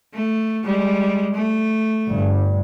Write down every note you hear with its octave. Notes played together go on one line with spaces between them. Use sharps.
A3
G3 G#3
A3
G1 G2